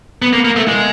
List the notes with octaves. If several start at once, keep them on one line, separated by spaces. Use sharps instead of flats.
B3
A#3
A#3
A3
G#3